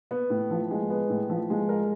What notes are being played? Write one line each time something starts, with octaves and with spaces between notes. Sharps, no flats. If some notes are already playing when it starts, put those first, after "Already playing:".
B3
A2
F3
G#3
B3
A2
F3
G#3
A#4